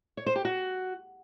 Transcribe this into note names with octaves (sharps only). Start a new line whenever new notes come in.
C#5
C5
G4
F#4